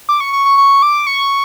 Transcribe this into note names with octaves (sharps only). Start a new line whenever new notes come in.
D6
C#6
C#6
C#6
C#6
D6
C#6